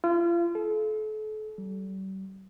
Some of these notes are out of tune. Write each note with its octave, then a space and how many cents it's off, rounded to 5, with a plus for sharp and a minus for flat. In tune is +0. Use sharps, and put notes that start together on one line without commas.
F4 -35
A4 -35
G3 -40